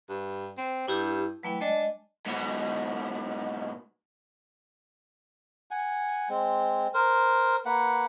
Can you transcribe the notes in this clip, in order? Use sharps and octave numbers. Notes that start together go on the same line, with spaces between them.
G2
C4
G2 D4 E4 G4
E3 F#3 A3 G5
G#3 D4 D#5
G#2 B2
F#5 G#5
G#3 C4
A#4 C5
A#3 B4 F#5